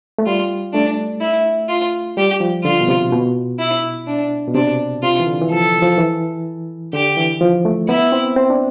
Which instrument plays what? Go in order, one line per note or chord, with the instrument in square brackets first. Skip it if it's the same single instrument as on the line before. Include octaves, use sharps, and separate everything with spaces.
[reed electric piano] A3
[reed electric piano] G3 [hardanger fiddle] F4
[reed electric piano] A3 [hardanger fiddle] D4
[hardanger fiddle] E4
F4
[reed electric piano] G3 [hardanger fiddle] G4
[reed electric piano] F3
[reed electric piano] D3 [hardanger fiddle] F4
[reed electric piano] B2
C3
B2
[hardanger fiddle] E4
D4
[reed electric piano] B2
[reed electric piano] C3 [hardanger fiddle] D4
[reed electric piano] C3 [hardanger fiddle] F4
[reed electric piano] E3
D3
E3
[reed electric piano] F3 [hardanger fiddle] A4
[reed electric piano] F3
E3
[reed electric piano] D3 [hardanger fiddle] G4
[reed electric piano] E3
F3
A3
[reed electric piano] B3 [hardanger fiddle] E4
[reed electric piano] C4
C4
D4